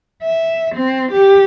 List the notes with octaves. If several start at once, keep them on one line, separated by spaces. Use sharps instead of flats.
E5
C4
G4